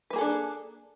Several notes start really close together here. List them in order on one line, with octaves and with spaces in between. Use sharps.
B4 A#3 G#4 A4 D4